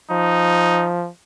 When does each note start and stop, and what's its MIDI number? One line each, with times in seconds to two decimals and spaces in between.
0.11 1.09 53
0.11 0.89 63